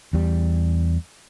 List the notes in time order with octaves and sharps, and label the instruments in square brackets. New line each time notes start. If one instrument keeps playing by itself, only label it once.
[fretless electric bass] E2 G3